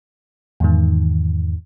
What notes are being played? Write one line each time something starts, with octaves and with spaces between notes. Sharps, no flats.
E2 G#2 D#3